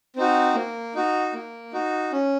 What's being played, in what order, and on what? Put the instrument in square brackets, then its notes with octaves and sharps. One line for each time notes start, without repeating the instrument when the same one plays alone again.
[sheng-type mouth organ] C4 D#4 F#4
A#3
D#4 F#4
A#3
D#4 F#4
C#4